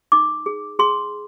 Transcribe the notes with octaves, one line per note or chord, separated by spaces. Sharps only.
D#4 D6
G#4
G#4 C6